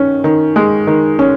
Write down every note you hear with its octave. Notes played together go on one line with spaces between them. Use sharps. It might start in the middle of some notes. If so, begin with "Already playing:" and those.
Already playing: D#3 C#4
D#3
G#3
D#3
C#4